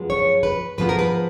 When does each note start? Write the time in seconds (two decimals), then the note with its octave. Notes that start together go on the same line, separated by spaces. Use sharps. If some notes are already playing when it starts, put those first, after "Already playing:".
Already playing: F#2 F3 G#3 B3
0.10 C#5
0.43 B4
0.78 G#2 F3 B3 B4
0.89 A#4
0.99 B4